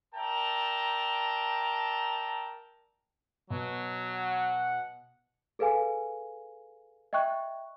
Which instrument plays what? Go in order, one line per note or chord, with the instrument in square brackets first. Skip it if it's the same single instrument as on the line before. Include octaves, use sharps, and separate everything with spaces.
[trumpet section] A#4 D5 E5 G5 A5 A#5
[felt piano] B2 [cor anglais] F#3
[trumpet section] F#5
[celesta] G#4 A4 B4 F5 G#5
D#5 E5 G5 C#6 F#6